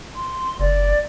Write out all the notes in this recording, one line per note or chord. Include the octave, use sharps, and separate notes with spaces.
C6
F#1 D5